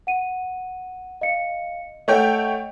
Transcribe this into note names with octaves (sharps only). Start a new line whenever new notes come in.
F#5 D#7
D#5 F5 C#7
A3 C#5 D#5 F#5 G5